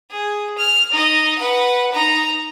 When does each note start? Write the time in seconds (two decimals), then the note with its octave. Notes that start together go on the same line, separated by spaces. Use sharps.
0.11 G#4
0.58 F6
0.92 D#4 D#5
1.38 B4 F#5
1.92 D#4 A#5